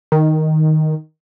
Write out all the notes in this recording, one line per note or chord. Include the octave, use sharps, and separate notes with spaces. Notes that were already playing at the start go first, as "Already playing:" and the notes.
D#3